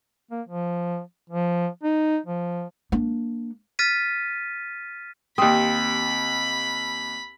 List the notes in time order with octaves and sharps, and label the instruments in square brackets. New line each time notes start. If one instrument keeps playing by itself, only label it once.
[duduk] A#3
F3
F3
D#4
F3
[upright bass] A#3 D4
[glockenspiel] F6 A6 B6 D#7
[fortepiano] D#2 D#6 [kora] C4 G4 [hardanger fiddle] B5